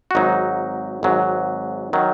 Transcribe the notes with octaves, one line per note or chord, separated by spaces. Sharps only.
F#4
G#1 G#2 F#3 D#4
G#1 G#2 F#3
D#3 F#3